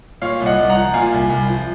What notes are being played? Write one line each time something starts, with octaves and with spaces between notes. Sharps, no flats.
A#2 C#5 F5
C2
D#5 F#5
C2
F#5 A#5
F3
A#2 F5 G#5
C2
C2
F3